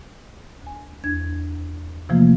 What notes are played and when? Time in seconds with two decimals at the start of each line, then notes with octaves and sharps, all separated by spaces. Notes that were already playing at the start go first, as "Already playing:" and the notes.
0.62 D2 G#5
1.04 E2 D4 G#6
2.09 C3 E3 F3 A3 A#3 F4